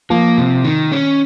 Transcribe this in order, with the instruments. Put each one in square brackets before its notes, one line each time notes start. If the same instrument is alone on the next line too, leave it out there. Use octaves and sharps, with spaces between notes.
[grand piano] F3 [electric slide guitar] A#3
[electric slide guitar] C3
D#3
C#4